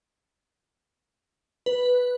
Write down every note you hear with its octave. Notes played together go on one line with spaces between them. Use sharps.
B4